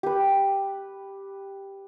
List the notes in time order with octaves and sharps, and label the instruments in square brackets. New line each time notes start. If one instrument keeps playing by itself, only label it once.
[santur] G4 B4